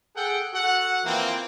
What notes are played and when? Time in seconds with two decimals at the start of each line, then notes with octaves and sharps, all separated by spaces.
0.16 G#4 A4 F#5 G5
0.53 F#4 A4 F#5
1.05 E3 F3 A#3 C4